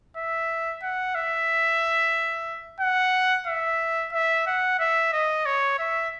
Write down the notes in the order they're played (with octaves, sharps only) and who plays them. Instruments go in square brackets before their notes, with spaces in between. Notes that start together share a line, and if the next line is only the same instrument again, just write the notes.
[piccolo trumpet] E5
F#5
E5
F#5
E5
E5
F#5
E5
D#5
C#5
E5